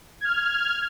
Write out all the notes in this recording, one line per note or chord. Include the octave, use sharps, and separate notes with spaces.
F6 G#6